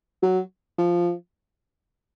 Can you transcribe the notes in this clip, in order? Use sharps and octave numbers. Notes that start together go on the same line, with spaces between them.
F#3
F3